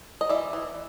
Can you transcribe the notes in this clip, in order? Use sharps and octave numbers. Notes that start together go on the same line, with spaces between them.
D#5
E3 D5 E5
E3